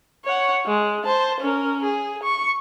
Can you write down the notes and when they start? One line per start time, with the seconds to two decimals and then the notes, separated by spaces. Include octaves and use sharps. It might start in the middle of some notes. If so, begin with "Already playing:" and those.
0.25 C#5 F#5
0.66 G#3
1.04 C5 A5
1.40 C#4 A#4
1.84 G#4
2.23 C#6